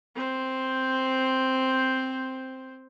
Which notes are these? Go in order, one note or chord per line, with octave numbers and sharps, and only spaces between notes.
C4 C5